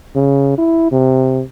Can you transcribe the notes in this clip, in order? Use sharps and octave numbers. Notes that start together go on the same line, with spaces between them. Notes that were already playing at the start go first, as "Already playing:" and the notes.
C#3
E4
C3